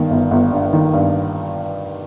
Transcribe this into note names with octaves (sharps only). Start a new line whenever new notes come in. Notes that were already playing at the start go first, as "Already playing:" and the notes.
Already playing: G1 G2 D#3
G1
G1
G2
D#3
G2